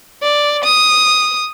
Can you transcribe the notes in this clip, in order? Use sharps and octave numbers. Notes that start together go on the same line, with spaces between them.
D5
D#6